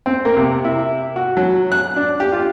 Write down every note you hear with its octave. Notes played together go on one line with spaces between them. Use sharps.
C4
A#3
C3
E4
F#4
F#3
F#6
D4
G4
F4